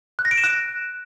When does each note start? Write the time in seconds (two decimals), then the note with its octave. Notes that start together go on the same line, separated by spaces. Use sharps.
0.19 F#6
0.25 A#6
0.31 D7
0.37 E7
0.44 F#6